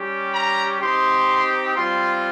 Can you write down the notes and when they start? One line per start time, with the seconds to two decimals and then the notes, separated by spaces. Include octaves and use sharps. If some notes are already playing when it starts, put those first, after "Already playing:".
Already playing: G3 C#4 G4
0.34 A#5
0.81 C4 D#4 G4 C6
1.76 G3 C4 F4 C6